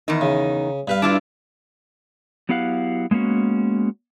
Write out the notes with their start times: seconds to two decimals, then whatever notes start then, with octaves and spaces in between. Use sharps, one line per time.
0.08 E2 D#3 D#4
0.21 C#3
0.88 G2 B4 F5
1.02 D4 E4 F4
2.49 F#3 B3 E4 G4 F5 F#5
3.11 G#3 A#3 B3 C#4 F#4